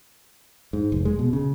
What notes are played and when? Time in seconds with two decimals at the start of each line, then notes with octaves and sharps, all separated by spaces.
0.73 G#2
0.92 F1
1.05 G#3
1.19 B2
1.33 C#3